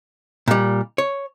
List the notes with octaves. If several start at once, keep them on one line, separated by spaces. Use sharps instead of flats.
A#2 G3
C#5